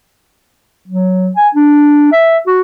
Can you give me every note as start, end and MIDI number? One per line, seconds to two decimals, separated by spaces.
0.88 1.30 54
1.36 1.48 80
1.55 2.08 62
2.12 2.38 76
2.47 2.61 66